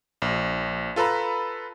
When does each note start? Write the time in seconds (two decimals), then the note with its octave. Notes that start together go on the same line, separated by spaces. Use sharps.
0.22 A#1
0.96 F4 A4 B4 A#5 B5